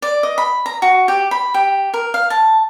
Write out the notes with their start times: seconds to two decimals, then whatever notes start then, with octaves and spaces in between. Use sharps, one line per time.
0.02 D5
0.23 D#5
0.38 B5
0.66 A#5
0.82 F#4
1.08 G4
1.31 B5
1.54 G4
1.94 A#4
2.14 F5
2.30 A5